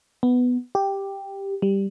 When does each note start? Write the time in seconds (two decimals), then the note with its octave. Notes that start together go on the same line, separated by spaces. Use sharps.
0.23 B3
0.75 G4
1.62 G3